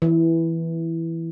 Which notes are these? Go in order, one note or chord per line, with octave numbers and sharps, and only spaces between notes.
E3